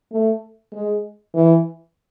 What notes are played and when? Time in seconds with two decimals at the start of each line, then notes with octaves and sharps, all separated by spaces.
0.12 A3
0.73 G#3
1.35 E3